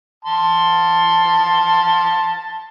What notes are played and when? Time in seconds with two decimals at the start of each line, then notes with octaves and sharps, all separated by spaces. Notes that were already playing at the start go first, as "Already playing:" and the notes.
0.25 A5 C6